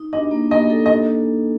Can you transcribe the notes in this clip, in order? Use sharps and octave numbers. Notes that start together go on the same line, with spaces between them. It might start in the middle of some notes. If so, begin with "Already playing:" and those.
Already playing: D#4
D4 D#5
A#3
A#3 D#5
A4
D#5